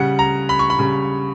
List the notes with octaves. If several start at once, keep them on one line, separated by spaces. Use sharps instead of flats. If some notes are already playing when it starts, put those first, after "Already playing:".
Already playing: C#3 G3 F#5
A#5
B5
C#6
B5
C#3 G3